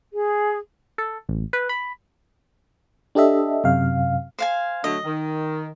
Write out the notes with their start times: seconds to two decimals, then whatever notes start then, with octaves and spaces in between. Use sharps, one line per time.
0.13 G#4
0.98 A4
1.29 A1
1.53 B4
1.69 B5
3.15 D4 G4 A4 D#5 E5
3.64 F#2 C3 F5
4.39 C5 F5 G#5
4.84 D3 F#3 A3 D#5
5.05 D#3